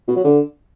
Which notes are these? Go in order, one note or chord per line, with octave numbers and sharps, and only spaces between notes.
B2
F#3
D3